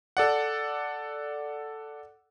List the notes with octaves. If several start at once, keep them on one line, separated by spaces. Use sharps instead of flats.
A4 D5 F#5